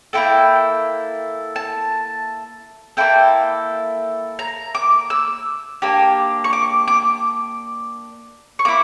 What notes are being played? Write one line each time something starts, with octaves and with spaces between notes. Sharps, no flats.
A#3 E4 A4 G5
A5
A#3 E4 A4 G5
A#5
D6
E6
A#3 D4 G4
C#6
D6
D6
C#6
A#3 E4 D6